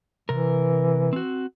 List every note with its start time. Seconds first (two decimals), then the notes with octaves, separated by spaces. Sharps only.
0.29 C3 E3 A#4
1.13 C4 F#4